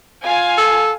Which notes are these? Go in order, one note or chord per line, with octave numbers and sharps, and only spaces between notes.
F4 F5 G#5
A4